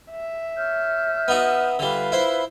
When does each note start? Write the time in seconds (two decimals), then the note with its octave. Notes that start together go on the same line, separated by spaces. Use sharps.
0.12 E5
0.55 C#5 F6 G6
1.28 B3 D#4 F#4
1.79 D3 G3 F4 B4
2.12 E4 C5